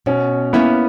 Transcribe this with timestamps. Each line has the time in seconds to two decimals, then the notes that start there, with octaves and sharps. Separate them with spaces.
0.06 B2 C#4
0.53 A#3 B3 C#4 E4